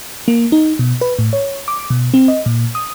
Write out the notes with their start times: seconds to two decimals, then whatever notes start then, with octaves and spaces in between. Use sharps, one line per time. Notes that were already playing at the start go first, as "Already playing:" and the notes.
0.28 A#3
0.52 D#4
0.79 B2
1.01 B4
1.19 A2
1.33 C#5
1.68 D6
1.90 B2
2.14 C4
2.28 D#5
2.46 A#2
2.75 D#6